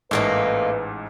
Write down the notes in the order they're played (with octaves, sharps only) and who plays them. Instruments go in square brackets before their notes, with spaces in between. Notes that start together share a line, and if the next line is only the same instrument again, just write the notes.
[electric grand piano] A1 G#2 [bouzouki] A3 A#3 D#4 [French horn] B4